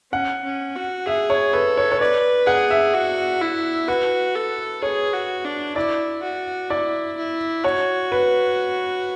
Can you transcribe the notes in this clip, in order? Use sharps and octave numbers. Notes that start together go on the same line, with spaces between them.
C#4 F#5
C#4
F#4
G#4 E5
C#5
A4 B4
C#5
C#5
B4 D5
G#4 F#5
E5
F#4
E4
F#4 B4
A4
G#4 C#5
F#4
D4
E4 D5
F#4
E4 D5
E4
F#4 C#5
B4